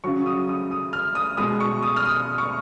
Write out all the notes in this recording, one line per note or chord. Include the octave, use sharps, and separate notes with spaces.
C#3 F#3 C#6
D#6
D#6
D#6
F6
D#6
B2 G#3 D#6
C#6
D#6
F6
D#6
C#6